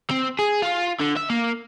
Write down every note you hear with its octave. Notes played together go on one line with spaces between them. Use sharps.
C4
G#4
F4
D3
E5
A#3